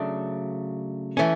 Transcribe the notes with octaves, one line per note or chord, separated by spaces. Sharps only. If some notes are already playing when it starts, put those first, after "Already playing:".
Already playing: C#3 F#3 A3 D4
E3 A3 C#4